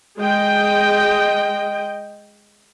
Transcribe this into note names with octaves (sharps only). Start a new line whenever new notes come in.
G#3 D#5 G5